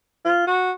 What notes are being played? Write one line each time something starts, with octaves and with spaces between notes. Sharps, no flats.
F4
F#4